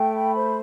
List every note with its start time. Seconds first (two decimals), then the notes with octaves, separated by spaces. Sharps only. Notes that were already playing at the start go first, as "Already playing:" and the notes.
Already playing: A3 G5
0.14 B5
0.35 C5